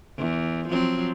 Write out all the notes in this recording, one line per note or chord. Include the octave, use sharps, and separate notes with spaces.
E2
F3 F#3 C4